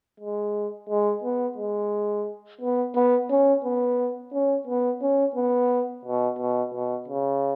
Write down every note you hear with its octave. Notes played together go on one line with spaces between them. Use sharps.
G#3
G#3
B3
G#3
B3
B3
C#4
B3
C#4
B3
C#4
B3
B2
B2
B2
C#3